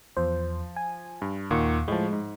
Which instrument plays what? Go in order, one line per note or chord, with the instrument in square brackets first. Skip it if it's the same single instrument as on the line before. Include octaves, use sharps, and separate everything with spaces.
[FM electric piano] E2 C5 [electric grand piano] F3
[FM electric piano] G#5
[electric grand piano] G2
[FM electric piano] D#2 F#5 C#6 [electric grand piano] A#2 D#3
[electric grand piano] A2 F3 [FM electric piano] G#3
[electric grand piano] G#2